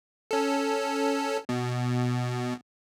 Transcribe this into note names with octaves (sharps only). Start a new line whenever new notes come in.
C#4 A4
B2